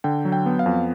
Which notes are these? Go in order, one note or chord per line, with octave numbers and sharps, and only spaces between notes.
D3 G5
F#3
G5
B3
F5
F2